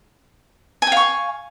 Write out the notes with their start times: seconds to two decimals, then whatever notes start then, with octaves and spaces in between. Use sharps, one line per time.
0.82 G#5
0.87 G5
0.92 F5
0.97 C#6